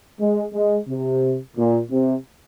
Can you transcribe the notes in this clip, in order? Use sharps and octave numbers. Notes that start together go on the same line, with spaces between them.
G#3
G#3
C3
A#2
C3